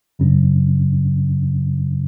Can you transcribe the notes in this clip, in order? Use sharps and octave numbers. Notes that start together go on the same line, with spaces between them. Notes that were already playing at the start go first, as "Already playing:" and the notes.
F#2 C#3 F#3 C#4